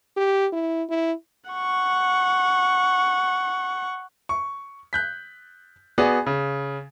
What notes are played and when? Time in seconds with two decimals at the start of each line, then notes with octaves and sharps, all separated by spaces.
0.17 G4
0.53 E4
0.90 E4
1.51 F#5 C#6
4.29 C#6
4.93 F#6 G6 B6
5.98 B3 F#4 G#4 D5
6.26 C#3